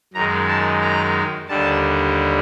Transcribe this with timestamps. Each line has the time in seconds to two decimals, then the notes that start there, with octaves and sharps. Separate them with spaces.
0.14 F#2 D#3 G#3 A#5
0.48 A5
0.81 A#5
1.49 D#2 D3 G3 A5